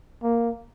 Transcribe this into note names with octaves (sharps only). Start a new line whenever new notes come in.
A#3